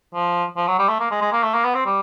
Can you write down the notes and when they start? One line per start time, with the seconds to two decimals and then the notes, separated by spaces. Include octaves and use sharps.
0.14 F3
0.57 F3
0.68 F#3
0.79 G3
0.89 A3
1.00 A#3
1.11 G#3
1.21 G#3
1.32 A#3
1.43 A3
1.54 A#3
1.65 B3
1.75 C4
1.86 G3